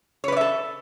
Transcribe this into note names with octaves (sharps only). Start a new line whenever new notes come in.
A4 B4 C#5 D5 E5